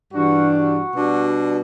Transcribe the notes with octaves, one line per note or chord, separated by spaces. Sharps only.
G2 E3 G3 D4 F#4
F#4
B2 G3 D4